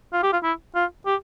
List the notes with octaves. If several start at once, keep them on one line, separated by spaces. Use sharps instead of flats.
F4
G4
F4
E4
F4
G4